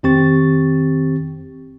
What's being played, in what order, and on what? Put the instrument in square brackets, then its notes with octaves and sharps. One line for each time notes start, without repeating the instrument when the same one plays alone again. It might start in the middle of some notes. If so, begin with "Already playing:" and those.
[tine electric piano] F2 D#3 C4 G4 C#6 A6